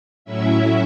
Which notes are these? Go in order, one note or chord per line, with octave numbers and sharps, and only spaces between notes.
A2 F#3 C#4 E4 E5